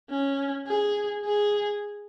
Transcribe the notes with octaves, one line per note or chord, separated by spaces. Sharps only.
C#4
G#4
G#4